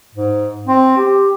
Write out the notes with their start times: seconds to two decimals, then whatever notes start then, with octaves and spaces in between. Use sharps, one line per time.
0.14 G#2
0.67 C4
0.97 G4